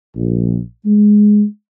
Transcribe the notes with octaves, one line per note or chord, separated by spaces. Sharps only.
A#1
G#3